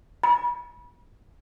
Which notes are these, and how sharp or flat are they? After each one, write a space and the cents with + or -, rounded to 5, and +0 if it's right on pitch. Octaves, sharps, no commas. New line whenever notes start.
B5 -35